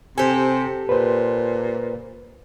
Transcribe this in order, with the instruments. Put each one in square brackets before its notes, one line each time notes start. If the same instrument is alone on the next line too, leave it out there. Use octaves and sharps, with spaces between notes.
[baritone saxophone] C3 [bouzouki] G4 A4 [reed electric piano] C5 G#5
[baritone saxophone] A#2 [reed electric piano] B4 C5